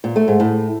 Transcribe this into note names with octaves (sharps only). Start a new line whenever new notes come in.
A#2
A3
G#2
A2